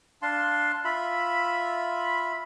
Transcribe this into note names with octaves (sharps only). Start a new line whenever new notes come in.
D4 F5 A5 C6
F4 E5 B5